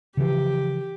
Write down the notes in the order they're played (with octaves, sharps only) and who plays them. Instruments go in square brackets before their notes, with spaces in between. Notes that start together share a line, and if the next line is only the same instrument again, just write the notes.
[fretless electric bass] C#3 E3 F3 [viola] G4